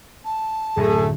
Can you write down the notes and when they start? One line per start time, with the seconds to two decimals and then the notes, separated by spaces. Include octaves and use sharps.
0.24 A5
0.77 D1 F#2 D3 A3 G#4 A4